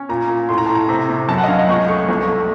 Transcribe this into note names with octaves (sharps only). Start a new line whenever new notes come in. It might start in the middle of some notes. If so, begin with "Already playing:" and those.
Already playing: C#4
A#2 A#5
A#2
A2 C6
A#5
A2 A5
A#5
C3
C3
F#2 A5
F#5
D#5
C#4 F5
D#5
C#2 C#6
A3 C#6
C2
A3